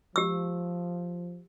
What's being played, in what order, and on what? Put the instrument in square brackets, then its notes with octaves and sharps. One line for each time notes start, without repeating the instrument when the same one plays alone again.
[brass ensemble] F3 [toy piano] G4 E6